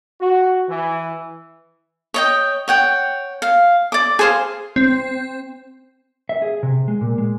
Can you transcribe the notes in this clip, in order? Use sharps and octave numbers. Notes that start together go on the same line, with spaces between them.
F#4
E3
C#5 D#5 G5
C#5 F#5 G5
F5
D5 D6
G#4 C5 F5
C4
E5
G#4
C3
G#3
A#2
G#3